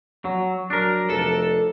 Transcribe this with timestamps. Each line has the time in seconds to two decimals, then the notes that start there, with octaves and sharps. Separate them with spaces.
0.25 F#3
0.70 F#3 D4 A#4
1.10 F1 A4